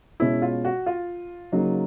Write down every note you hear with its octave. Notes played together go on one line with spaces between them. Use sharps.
B2 G#3 C#4 E4
F4
F#4
F4
C#3 F#3 A#3 D#4